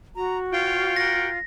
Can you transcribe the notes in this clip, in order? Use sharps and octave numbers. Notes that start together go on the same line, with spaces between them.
F#4 A#5
F4 C#5 F5 G5
A#4 F#5 G5 A#6